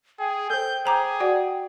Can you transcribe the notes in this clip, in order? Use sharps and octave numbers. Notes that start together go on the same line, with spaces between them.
G#4 G5
A4 C5 G6
G#4 C5 A#5 D6
F#4 D5 F#5